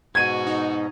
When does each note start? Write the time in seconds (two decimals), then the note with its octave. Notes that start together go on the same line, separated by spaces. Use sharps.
0.15 G#2 B2 F#4 G#6 D#7
0.47 D#4